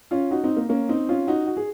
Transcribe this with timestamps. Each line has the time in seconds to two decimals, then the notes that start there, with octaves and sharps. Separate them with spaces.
0.11 C#4 F4
0.31 D#4 F#4
0.44 C4 D#4
0.57 A#3
0.69 A#3 C#4
0.89 C4 D#4
1.09 C#4 F4
1.27 D#4 F#4
1.47 F#4
1.57 G#4